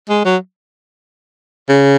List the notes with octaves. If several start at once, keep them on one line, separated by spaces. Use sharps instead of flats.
G#3
F#3
C#3